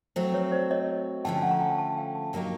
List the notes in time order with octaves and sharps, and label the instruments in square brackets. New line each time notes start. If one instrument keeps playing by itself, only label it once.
[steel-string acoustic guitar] F#3 A3 C4 [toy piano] C5
[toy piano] B4 C#5
C5 D5
C#5 D#5
[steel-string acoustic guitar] D3 F3 A3 C#4 [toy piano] G5 A5
[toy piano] F#5 G#5
A#5
G5 A5
G5 A5
F5 G5
G5 A5
[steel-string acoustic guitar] A#2 F#3 A#3 D#4 G4